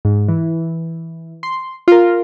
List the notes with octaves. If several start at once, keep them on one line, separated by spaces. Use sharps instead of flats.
G#2
E3
C6
F4 A#4